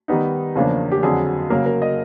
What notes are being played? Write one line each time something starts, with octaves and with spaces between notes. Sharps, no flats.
D#3 G3 B3 D#4
E2 C#3 F3 A#3 D4
G4
F2 D3 F#3 G#4
C#3 F#3 A#3 A#4
A#4
D#5